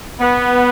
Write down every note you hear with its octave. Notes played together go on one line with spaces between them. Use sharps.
B3